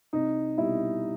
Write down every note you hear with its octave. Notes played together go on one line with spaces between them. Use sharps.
C2 D#4
B2 G3 E4